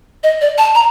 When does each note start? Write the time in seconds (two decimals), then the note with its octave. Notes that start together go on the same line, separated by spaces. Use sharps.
0.23 D#5
0.41 D5
0.58 A5
0.75 A#5